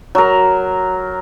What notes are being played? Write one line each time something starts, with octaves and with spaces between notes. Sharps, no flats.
F#3 A#4